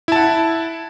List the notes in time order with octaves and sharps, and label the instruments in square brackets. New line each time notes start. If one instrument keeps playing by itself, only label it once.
[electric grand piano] E4
A5
F#5